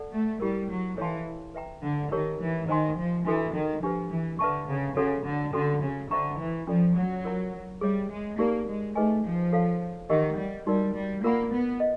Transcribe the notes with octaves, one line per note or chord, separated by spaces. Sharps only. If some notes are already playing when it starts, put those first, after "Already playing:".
Already playing: A4 D5 F#5 A5
A3
G3 E4 G4 A#4
F#3
E3 A4 C#5 F5 A5 C6
B4 E5 G5 A#5
D3
D#3 D#4 G4 A#4 C#5
E3
D#3 C5 D#5 G#5 C6
F3
E3 D4 F#4 A4
D#3
F3 D4 G4 B4
E3
D3 B4 E5 A5 C#6
C#3
C#3 F#4 A4 C#5 F#5
D3
D3 C#4 F#4 A4
C#3
D3 C5 E5 G5 A#5 C#6
E3
F3 C#4 F4 A4 D5
F#3
F4 A#4 C#5 F#5 A#5
G3 G#4 C#5 E5
G#3
A#3 D#4 G4 A#4 D5
G#3
A3 D#4 G#4 B4 D#5 G#5
F3
A4 C#5 F5 A5
D#3 G4 A#4 D#5 F#5
G3
G3 D#4 F#4 A#4 D5
G3
A#3 F4 A#4 D5 F#5 B5
B3
D#5